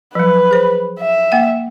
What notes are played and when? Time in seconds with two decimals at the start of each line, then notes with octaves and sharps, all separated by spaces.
0.15 F3 F#3 B4
0.51 G#4 C5
1.00 E5
1.32 A#3 F#5